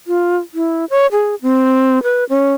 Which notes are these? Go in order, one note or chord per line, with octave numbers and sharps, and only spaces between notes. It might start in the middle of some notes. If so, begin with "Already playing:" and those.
F4
E4
C#5
G#4
C4
B4
C#4